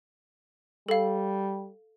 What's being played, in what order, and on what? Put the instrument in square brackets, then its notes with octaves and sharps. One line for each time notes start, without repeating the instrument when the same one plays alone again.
[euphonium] G3 [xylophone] A4 F5